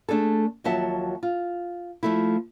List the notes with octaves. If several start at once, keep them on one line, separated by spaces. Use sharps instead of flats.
A3 D4 G#4 A4
D#2 F3 F#3 F#4 E5 A5
F4
F3 A3 E4